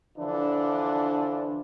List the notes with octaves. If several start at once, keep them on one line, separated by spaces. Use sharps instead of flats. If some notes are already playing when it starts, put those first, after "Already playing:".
D3 E3 F3 D4